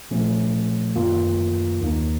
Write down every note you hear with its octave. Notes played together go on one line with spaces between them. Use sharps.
A#2 F3 A3 C#4
F#2 D#3 A#3 F4
D#2 D#3 A#3 D#4